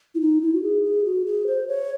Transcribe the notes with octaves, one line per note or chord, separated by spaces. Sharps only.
E4
D#4
E4
F#4
G#4
G#4
F#4
G#4
C5
C#5